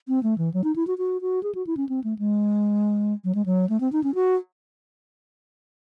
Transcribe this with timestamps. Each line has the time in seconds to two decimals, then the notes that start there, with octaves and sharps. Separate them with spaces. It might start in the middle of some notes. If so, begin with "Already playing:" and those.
0.08 C4
0.23 A3
0.38 E3
0.54 F#3
0.64 D#4
0.76 E4
0.87 F#4
0.98 F#4
1.21 F#4
1.43 G#4
1.55 F#4
1.67 E4
1.77 C#4
1.89 C4
2.04 A3
2.19 G#3
3.24 F#3
3.35 G#3
3.46 F#3
3.69 A3
3.80 C4
3.92 D#4
4.04 C#4
4.15 F#4